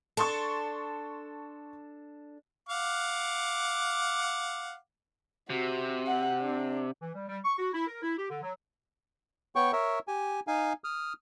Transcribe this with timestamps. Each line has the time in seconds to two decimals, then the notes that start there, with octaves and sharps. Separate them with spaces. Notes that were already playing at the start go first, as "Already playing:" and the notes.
0.17 D4 A4 A5 C6 C#6
2.69 F5 F#5 D6
5.50 C3 F#4
6.07 F#5
6.40 D4
7.02 E3
7.15 G3
7.29 G3
7.45 C#6
7.59 F#4
7.73 E4
7.87 A#4
8.03 E4
8.17 G4
8.30 D3
8.42 F#3
9.56 B3 C#5 G5 C#6
9.73 A#4 C#5 E5
10.08 G4 G#5
10.47 D#4 F5 G#5
10.84 D#6 F6